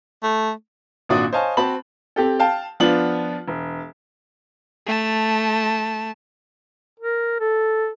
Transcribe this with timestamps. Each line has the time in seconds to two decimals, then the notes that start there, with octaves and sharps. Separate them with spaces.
0.23 A3
1.09 G#1 A#2 D4 F#4 D5 D#6
1.33 C5 C#5 D#5 F5 G#5 A5
1.57 C4 F#4 A5 B5 F#7
2.16 C4 G4 A4
2.39 F5 G5 A5
2.80 F3 B3 D4 F4 F#5 F#7
3.48 E1
4.87 A3 A5
7.00 A#4
7.40 A4